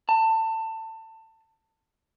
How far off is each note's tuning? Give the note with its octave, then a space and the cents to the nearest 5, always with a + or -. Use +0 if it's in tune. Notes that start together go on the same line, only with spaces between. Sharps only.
A5 +25